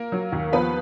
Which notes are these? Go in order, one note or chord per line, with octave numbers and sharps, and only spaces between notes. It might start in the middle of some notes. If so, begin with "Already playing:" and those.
Already playing: A#3 A#4
F#3
D#2
F3 B3 B4